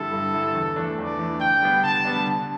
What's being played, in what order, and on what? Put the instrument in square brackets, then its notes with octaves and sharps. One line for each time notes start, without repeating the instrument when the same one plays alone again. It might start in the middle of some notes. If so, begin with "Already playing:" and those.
Already playing: [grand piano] G2 D3 G3 E4 [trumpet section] A4
[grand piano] G2
D3 G3 E4
E2
E3 A3 D4
[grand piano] E2 [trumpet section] D5
[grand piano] E3 A3 D4
[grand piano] D3 [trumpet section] G5
[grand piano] G3 B3 D4
[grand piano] D3 [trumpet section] A5
[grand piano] G3 B3 D4
D3